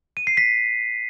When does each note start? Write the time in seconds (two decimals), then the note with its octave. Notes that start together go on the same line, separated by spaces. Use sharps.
0.17 D#7
0.27 C7
0.37 B6